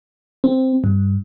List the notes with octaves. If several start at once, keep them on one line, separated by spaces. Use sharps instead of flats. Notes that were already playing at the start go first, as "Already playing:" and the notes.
C4
G2